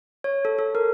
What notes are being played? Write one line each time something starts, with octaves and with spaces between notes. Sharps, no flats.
C#5
A4
A4
A#4